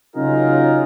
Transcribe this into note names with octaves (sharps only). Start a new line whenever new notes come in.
C#3 F#3 D#4 F4 G#4 A#4